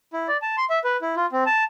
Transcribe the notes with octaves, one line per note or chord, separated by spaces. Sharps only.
E4
D5
A5
C6
E5
B4
E4
F4
C4
A5